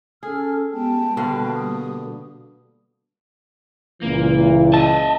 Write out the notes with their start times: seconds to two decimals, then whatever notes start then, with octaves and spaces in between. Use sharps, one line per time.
0.23 C#4 G#4 A4 F6
0.70 G#3 B3 G4 G5 A5
1.17 B2 D3 G3 A#3 F5
1.54 G4 D#6
4.02 C#2 A#2 E3 A#3
4.74 D#5 E5 A5